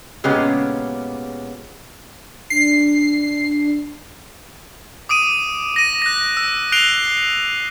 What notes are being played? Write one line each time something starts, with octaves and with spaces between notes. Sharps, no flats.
A#2 C#3 G#3 B3 C#4 G4
D4 C7
D6 D#6 D7 D#7
A#6 D#7
F#6 A#6
E6
F#6 C7 D7 F7 G7